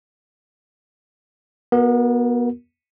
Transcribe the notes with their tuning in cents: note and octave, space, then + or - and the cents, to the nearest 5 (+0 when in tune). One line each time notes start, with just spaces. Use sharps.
B3 -30 F#4 +0 A#4 +0